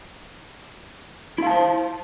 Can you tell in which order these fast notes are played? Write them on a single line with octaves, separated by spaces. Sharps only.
E4 F5 A5 C5